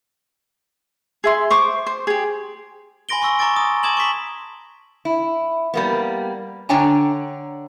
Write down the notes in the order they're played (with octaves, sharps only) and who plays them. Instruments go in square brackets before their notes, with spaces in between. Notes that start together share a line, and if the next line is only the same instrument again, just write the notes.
[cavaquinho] G#4 E5 C6
C5 C#6 D6
C5
G4 G#4
[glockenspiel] G#5 B5 C6 A#6 D7 G7
C6 C#6 E6 A#6
A#5 C#6 D6 A6 D7
D#6
A5 D6 D#6 G#6 E7 F#7
C#6 D6 B6 F#7
[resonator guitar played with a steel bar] E4
G3 A#3 B3
D3 D4 C#5 G5 G#5 A#5